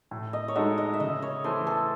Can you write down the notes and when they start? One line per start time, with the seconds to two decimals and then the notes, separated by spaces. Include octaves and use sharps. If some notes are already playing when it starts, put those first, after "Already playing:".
0.11 A2
0.33 D#5
0.48 C#5
0.56 G#3 D#4 F#4 A4 D#5
0.78 D#5
0.93 E5
1.00 C#3 D#5
1.22 C#5
1.44 E3 A3 C5
1.67 A4